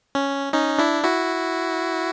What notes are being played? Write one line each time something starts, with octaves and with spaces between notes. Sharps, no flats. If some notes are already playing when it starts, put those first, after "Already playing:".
C#4
C#4 D#4
D4 E4
E4 F#4